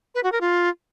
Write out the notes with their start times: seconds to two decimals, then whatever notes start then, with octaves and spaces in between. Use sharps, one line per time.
0.15 B4
0.23 F#4
0.32 A#4
0.41 F4